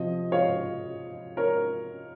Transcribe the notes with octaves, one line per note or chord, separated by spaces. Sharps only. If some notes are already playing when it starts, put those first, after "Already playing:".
Already playing: C3 F3 D#5
C#5 F5
A#4 C#5